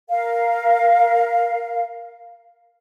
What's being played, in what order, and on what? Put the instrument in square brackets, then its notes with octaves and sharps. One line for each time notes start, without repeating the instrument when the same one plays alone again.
[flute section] A#4 F5